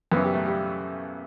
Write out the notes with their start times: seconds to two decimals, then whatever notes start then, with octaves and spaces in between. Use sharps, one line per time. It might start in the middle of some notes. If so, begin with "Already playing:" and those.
0.12 F#2 C#3 E3 B3
0.24 G3
0.34 A3
0.46 G3